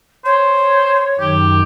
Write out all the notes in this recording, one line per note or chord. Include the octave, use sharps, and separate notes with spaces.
C5 C#5
F#2 D#3 G4